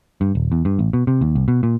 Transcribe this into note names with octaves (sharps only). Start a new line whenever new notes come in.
G2
D#1
E2
G2
A1
B2
C3
D#2
C2
B2
A#2